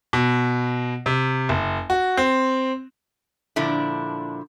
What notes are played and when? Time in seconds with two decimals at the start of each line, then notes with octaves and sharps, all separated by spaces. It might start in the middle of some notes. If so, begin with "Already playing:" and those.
0.13 B2
1.06 C3
1.49 F#1
1.90 F#4
2.17 C4
3.56 A#2 D3 F3 D4 E4